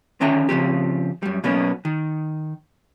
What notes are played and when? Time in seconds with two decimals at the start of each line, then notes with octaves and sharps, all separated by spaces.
0.21 D3 D#3 C#4 E5 G5 A#5
0.49 C#3 F3 C4 G4
1.23 F#2 G3
1.44 B2 F#3 A#3 B3 C#4
1.85 D#3